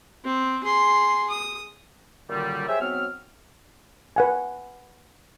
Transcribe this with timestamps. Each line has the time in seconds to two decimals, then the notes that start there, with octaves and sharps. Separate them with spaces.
0.25 C4
0.64 G#4 C6
1.30 D#6
2.29 F#2 A#2 D3 D#3 F#3 G3
2.68 G4 G#4 C5 C#5 E5
2.80 G#2 F#3 B3 C4 F6
4.16 B4 F#5 G#5